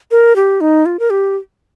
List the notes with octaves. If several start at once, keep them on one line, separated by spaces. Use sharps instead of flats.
A#4
G4
D#4
F4
A#4
G4